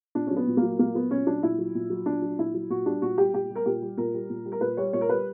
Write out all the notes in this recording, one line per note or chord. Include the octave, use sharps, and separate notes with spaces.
A#2 D4
F#3 C#4
B3
A#2
A#3
F#3
A#2 A#3
F#3 B3
A#2 C#4
F#3 D4
A#2 E4
F#3
A#2
F#3
A#2 D4
F#3
A#2 E4
F#3
A#2 F#4
G3 D4
A#2 F#4
G3 G4
A#2 G4
G3
A#4
A#2 G4
G3
A#2 A#4
G3
A#2
G3
A#4
A#2 B4
G3 C#5
A#2 C#5
A#4
G3 B4